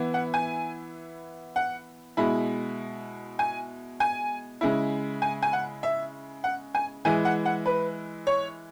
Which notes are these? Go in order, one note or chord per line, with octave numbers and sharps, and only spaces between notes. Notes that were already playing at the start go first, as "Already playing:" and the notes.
Already playing: E3 B3 E4
F#5
G#5
F#5
B2 G#3 E4 B5
G#5
G#5
C#3 G#3 E4
G#5
G#5
F#5
E5
F#5
G#5
E3 G#3 E4 G#5
F#5
F#5
B4
C#5